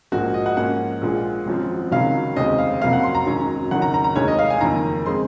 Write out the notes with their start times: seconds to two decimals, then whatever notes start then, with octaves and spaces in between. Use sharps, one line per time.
0.12 A#1 G#2 F3 A#3 F#4
0.34 D#5
0.46 F#5
0.57 G#2 F3 A#3 C#4 F#5
1.02 A#1 A#2 F3 G#3
1.46 G#1 F#2 F3 C4
1.91 C#2 C3 D#3 F#3 C#4 F5
2.36 F1 D#2 C#3 G#3 C4 D#5
2.58 F5
2.81 F2 C3 F#3 A#3 C#4 F5
2.93 F#5
3.03 C6
3.15 A#5
3.26 G#1 F#2 D#3 F#3 C#4
3.71 F#1 F#2 D#3 F#5
3.82 A#5
3.94 A#5
4.04 A#5
4.16 F1 D#2 D#3 G#3 C#5
4.28 D#5
4.39 F5
4.50 G#5
4.61 F#1 F2 D#3 A#3 A#5
5.06 C#3 G#3 C4 C6